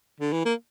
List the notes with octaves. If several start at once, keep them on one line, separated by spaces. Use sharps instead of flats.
D3
E3
A#3